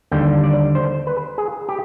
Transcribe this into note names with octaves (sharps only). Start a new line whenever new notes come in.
D#2 D3 G3 G5
D5
C5
B4
G#4
G4